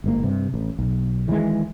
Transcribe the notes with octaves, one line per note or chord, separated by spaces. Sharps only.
G1 G#2 A#3
G2 C3
A1
B1
D#3 E3 F#3 G#3